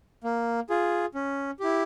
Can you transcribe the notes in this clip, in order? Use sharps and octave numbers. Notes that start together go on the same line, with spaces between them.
A#3
F4 G#4
C#4
E4 G4